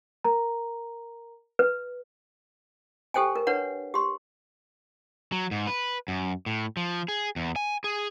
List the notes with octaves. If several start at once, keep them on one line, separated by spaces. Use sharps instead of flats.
A#4 A#5
B4
G4 A4 C5 G5 G#5
A#4
D4 B4 C#5 F#5
G4 C6
F#3
G#2
B4
F#2
A2
F3
G#4
E2
G#5
G#4